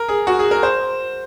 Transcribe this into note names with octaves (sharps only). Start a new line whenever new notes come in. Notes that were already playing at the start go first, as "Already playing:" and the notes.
Already playing: A#4
G#4
F#4
G#4
A#4
C5